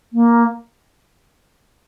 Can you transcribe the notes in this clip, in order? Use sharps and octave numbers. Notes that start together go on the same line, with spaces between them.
A#3